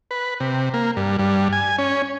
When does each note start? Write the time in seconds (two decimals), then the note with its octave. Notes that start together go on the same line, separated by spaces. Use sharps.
0.11 B4
0.40 C3
0.74 A#3
0.97 G2
1.19 G2
1.53 G#5
1.78 C#4